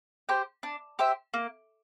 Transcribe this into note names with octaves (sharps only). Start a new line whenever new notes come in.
G4 C5 G5
D4
G4 C5 E5
A#3